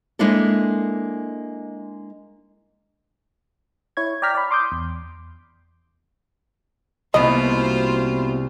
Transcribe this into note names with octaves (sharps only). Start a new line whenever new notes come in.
G#3 A#3 D4 E4 A4
E4 C#5 G#6
D5 G5 A#5 F6 B6
D5 B5
C6 D6 D#6 G6
E2
C2 B2 A#3 B3 E4 F4 C5 D#5